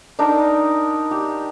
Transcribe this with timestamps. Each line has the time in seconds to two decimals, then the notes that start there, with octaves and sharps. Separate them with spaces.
0.19 D4 D#4 A#4 G5
1.11 G4